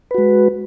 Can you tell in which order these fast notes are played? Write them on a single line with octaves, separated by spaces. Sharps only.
B4 F#4 G#3